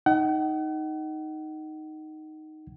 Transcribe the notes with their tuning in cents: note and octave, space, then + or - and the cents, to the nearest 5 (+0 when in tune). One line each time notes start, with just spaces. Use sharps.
D#4 +0 F#5 +40